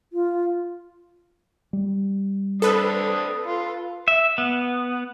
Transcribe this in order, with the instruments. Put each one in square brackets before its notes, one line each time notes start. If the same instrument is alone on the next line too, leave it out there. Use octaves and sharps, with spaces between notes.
[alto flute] F4
[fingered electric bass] G3
[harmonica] C4 D4 D#6 [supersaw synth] A4 B4
[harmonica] F4
[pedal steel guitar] E5
B3